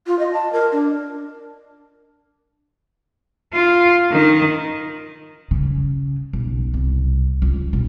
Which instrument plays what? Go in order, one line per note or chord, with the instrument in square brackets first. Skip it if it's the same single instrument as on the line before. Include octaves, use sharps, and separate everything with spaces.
[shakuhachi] F4
D#5
A5
A#4
D4
[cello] F4
D#3
[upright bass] C#3
B1
C2
C#2
B1